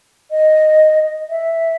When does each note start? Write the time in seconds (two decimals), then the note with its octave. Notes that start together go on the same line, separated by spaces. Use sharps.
0.31 D#5
1.30 E5